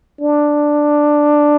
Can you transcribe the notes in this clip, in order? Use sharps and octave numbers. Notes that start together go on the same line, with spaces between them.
D4